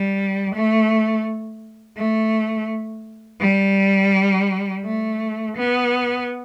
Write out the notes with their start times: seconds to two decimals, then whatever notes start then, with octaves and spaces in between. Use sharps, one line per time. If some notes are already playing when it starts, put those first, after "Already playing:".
Already playing: G3
0.53 A3
1.96 A3
3.40 G3
4.83 A3
5.55 B3